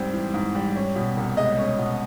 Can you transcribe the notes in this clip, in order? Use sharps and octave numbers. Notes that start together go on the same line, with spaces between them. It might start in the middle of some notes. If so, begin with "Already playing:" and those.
Already playing: G#2 G3 C4
E3
G#2
G3
C#4
B2
C2
G#3 D#5
C#4
B2